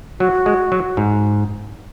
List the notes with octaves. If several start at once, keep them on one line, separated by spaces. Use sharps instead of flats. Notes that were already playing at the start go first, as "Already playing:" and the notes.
F#3 F#4
G#3
F#3
G#2